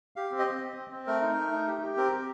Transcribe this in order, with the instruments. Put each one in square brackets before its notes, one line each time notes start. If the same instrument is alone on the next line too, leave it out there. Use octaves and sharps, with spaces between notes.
[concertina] G4 F5
C4
D#5
C4
C4
C4
C4
A3 A#4
D#4
A3
D#4
G4
G4
C4 A#4
G4